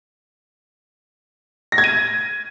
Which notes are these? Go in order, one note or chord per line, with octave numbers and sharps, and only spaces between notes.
A#6
G#6
D#7